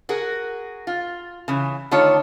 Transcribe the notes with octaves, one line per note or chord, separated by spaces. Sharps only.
F#4 G#4 A#4
F4
C#3 E3
D3 D#3 A3 F4 C#5